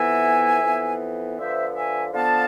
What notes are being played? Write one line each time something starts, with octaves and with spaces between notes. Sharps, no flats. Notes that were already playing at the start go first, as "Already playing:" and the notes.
Already playing: F2 E3 B3 E5 G#5
F2 E3 B3
D3 F3 B3 C5 E5
E5 G#5
D3 F3 B3 F5 A5